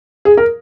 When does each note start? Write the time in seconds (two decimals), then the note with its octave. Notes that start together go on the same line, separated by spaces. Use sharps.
0.25 G#4
0.37 A#4